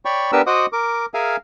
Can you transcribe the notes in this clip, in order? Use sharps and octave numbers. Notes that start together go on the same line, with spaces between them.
C#5 D5 G5 B5 C#6
B3 D4 G4 A#4 B4 E6
F#4 C5 D#5 F#5 D6 D#6
A#4 D6
G#4 A#4 E5 F5 G#5